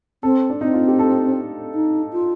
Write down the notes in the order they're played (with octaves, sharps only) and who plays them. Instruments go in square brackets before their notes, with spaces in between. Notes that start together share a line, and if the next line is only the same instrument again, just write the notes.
[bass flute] C4 [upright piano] A4
[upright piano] D4
[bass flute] C4 [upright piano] D#4
[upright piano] F4
G4
A4
[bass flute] D#4
F4